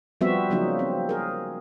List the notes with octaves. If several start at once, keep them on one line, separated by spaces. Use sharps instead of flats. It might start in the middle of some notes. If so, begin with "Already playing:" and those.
F3 G3 B3 C4 F#4 E5
C#3 F3 F#3 A#3 D#4
C4
G#4 A#4